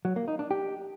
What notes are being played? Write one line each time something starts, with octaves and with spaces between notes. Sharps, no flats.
F#3
A#3
D#4
D4
G4